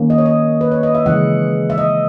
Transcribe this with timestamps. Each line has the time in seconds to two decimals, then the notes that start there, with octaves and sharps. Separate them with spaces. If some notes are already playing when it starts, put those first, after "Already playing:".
Already playing: D#3 A#3 C#4
0.10 D#5
0.18 C#5
0.26 D#5
0.61 B4
0.72 C#5
0.83 D#5
0.95 E5
1.06 C#3 E3 G#3 F#5
1.70 E5
1.78 D#5